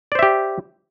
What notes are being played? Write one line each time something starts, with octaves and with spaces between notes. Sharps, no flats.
G4 C5 D5 E5